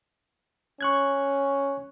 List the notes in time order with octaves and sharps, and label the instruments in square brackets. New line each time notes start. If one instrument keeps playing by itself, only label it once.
[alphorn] C#4 [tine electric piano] C#6 F#6 G#6